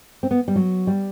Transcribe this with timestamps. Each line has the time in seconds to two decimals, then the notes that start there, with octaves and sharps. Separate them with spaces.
0.23 C4
0.31 B3
0.48 G3
0.56 F#3
0.87 G3